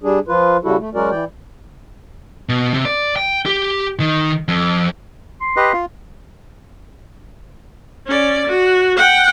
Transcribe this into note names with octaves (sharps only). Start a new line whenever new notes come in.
G3 D4 G#4
F3 F4 B4
C#3 G3 E4 F#4 A4
A3
F#3 G#3 C#4 F#4 A#4 D5
E3 D5 G5
B2
C3
D5
G5
G4
D#3
F2
C6
G4 B4 D#5
F4
C#4 D5
F#4
F#5 G5